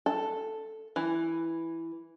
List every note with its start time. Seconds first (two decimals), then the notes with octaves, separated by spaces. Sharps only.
0.06 A4
0.96 E3